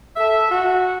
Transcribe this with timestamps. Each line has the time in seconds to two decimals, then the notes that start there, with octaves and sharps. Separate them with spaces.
0.16 A4 E5
0.50 F#4